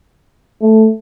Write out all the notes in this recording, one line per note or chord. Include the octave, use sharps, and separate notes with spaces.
A3